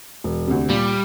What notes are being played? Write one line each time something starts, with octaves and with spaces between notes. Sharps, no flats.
E1
D2 C3
A#2 G3